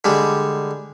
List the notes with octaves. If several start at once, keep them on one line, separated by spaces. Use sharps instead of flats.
D3 G3 G#3